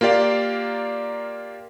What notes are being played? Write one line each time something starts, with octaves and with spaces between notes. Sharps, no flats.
A#3 F4 G4 D5 F5